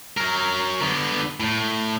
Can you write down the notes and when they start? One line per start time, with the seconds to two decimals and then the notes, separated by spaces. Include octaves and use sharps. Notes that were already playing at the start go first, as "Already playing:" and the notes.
0.17 F#3 A#4
0.82 D3 B3
1.40 A2